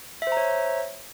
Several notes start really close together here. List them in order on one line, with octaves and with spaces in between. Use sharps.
E5 C5 A#5 C#5